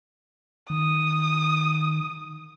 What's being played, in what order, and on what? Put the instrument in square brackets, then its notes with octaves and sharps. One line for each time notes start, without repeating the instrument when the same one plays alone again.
[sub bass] D#3 [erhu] D#6